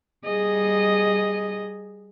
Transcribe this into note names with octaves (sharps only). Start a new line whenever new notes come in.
G3 G#4 D#5